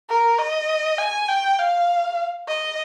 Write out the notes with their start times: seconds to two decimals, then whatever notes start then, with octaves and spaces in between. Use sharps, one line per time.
0.09 A#4
0.39 D#5
0.98 G#5
1.28 G5
1.59 F5
2.47 D#5